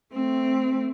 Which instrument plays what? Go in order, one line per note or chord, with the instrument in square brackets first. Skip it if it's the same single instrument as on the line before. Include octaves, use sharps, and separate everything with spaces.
[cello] A3 C4